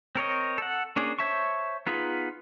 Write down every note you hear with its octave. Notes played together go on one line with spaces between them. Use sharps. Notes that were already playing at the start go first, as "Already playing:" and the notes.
C4 A#4 C#5 D#5
A4 F#5
A#3 C#4 D4 G#4
C5 C#5 E5 A5 C#6
B3 D#4 F4 G#4 B4